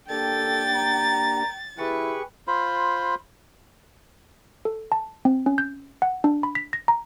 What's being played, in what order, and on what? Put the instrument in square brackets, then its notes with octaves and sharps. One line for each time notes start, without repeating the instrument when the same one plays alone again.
[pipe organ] A#3 D4 G4 [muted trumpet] A4 [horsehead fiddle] G5 [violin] A6
[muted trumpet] A#5
[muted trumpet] E4 [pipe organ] G4 G#4 C#6 [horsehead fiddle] B4
[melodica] F4 C5 B5
[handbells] A4
A5
C4
C#4
G6
F#5
D4
B5
B6
A#6
A#5